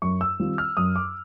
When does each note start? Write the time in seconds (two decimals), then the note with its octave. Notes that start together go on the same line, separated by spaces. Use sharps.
0.02 F#2 C#6
0.21 E6
0.39 D#3 G3 C4 F4
0.58 F6
0.77 F#2 D#6
0.96 D6